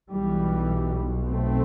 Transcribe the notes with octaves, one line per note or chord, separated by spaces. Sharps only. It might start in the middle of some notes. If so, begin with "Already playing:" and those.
B1 B2 E3 G3
A3 C4